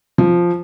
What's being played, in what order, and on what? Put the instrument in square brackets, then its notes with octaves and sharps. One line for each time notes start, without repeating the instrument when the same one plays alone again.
[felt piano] F3